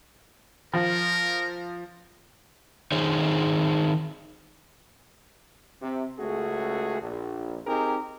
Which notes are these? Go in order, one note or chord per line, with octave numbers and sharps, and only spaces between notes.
F3 A#4
D#3 D#4 G#4 C5 C#5
C3
C#2 A3 C#4 F#4 G#4
A#1
C4 D#4 G4 G#4 A#4